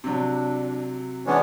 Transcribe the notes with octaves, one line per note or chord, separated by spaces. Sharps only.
C3 F#3 D4
E3 G#3 B3 C#4 D4 B4 C#5